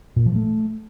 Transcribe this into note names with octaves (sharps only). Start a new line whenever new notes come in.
A#2
F3
A3